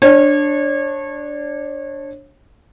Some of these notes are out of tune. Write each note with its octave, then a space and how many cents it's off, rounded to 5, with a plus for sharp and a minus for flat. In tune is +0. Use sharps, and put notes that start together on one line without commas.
D4 +0 C#5 -30